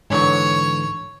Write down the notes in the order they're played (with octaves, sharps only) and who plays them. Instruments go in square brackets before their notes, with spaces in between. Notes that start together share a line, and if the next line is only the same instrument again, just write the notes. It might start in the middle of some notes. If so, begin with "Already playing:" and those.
[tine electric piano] G#2 D3 E3 [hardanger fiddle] C#5 C#6